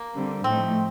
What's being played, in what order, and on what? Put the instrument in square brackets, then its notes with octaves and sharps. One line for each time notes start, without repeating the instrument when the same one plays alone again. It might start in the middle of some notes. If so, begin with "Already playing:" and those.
Already playing: [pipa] A#3
[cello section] D3 G3 C4
[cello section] A2 F3 A3 D#4 [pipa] C4